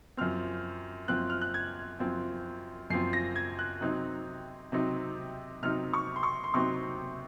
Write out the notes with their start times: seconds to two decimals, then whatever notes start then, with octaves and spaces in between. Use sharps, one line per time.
0.17 F#2 F3 C4 F6
1.08 F#2 F3 C4 F#6
1.30 F6
1.41 F#6
1.54 G#6
1.99 F#2 F3 C4
2.90 F#2 F3 C4 C7
3.13 A#6
3.36 G#6
3.59 F#6
3.81 C3 F#3 C4 D#4
4.72 C3 F#3 C4 D#4
5.62 C3 F#3 C4 D#4 F6
5.93 C#6
6.16 C6
6.23 C#6
6.44 C6
6.54 C3 F#3 C4 D#4 C#6